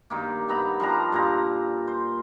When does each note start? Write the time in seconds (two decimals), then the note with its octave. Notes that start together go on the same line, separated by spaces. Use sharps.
0.10 G2 D#3 A#3
0.48 G2 B3 A#5 B5
0.80 F3 G3 D4 A#5
1.12 G2 A#2 F4 A#5
1.87 C5